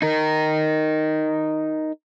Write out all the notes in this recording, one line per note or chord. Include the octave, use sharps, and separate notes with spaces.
D#4 A#4